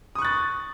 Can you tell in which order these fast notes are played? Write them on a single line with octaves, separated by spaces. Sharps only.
D#6 C#6 F#6 A6